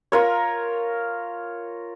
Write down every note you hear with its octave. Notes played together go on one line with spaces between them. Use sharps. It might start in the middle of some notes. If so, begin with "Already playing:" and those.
F4 A#4 C#5